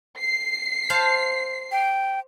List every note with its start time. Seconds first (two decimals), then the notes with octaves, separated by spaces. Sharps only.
0.19 C7
0.90 C5 F5 A5
1.72 G5